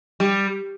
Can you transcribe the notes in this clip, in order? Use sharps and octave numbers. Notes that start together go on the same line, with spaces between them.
G3